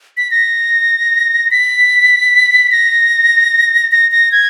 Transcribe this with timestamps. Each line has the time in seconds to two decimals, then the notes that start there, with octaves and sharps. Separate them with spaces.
0.17 B6
0.31 A#6
1.51 B6
2.72 A#6
3.92 A#6
4.12 A#6
4.32 G#6